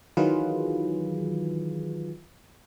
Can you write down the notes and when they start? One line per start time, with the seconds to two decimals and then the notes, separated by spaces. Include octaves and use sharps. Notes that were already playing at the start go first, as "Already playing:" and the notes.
0.17 D#3 E3 F#3 F4 G#4 B4